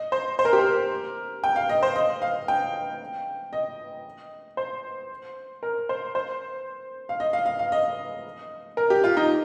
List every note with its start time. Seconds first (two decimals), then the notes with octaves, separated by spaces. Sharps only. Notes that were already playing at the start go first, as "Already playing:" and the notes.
Already playing: D#5
0.12 C5
0.39 C5
0.45 A#4
0.53 G4
0.59 A#4
1.44 G5
1.56 F5
1.69 D#5
1.83 C5
1.96 D#5
2.22 F5
2.48 G5
3.53 D#5
4.57 C5
5.63 A#4
5.89 C5
6.15 C5
7.09 F5
7.20 D#5
7.33 F5
7.46 F5
7.59 F5
7.72 D#5
8.77 A#4
8.90 G4
9.04 F4
9.17 D#4